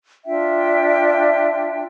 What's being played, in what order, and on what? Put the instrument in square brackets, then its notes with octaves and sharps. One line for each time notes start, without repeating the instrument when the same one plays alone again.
[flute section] D4 F4 E5 G5